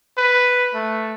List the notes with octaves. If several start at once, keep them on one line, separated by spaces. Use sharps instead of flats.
B4
A3